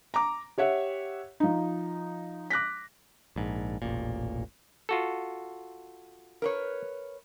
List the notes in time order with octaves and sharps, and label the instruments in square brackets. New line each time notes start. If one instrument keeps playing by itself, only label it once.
[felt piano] A#5 D6
G4 C#5 E5 F#5
F3 D#4
D6 F#6 A#6 B6
[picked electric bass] A#1 G#2
E1 A1 A#2
[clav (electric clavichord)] F4 F#4 A4
[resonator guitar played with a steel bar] A#4 B4 C#5